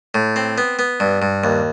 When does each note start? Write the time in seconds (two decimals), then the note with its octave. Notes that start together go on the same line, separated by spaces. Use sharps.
0.15 A2
0.36 C4
0.58 B3
0.79 B3
1.00 G2
1.22 G2
1.44 D#2